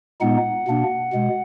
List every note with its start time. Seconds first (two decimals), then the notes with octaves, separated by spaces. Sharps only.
0.21 A#2 G#3 B3 D#4 F#5
0.67 B2 A#3 D4
1.13 B2 G#3